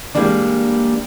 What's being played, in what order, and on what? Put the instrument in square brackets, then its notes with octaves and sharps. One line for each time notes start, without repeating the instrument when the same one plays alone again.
[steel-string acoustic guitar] E3 F3 G3 G#3 A#3 D4